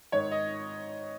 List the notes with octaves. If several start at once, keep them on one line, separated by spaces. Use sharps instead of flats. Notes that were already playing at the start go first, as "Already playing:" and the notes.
G#2 D#3 C#5
D#5